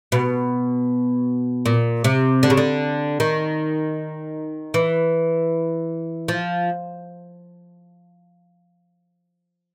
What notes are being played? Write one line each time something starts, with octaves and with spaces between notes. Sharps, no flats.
B2
A#2
C3
D3
C#3
D3
D#3
E3
F3